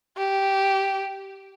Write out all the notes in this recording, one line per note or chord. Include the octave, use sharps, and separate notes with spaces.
G4